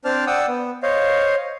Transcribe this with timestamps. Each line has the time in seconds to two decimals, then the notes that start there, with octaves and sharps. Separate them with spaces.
0.05 C4 D4 C5 D5 A5 F6
0.27 D5 F#5 G5 D#6 E6
0.48 B3
0.83 C5 C#5 D#5 F5